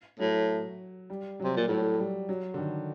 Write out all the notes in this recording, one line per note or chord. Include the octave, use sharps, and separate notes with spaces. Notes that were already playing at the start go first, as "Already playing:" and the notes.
A2 F#3
G3
F#3
C3
A#2
A2 F#3
G3
F#3
D3
D#3